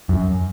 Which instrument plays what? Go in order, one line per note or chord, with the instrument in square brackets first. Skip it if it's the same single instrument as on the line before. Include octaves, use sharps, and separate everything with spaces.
[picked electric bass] F#2